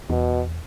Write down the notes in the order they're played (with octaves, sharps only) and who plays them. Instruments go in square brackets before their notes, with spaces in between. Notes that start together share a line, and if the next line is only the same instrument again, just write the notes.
[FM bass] E2 [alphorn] B2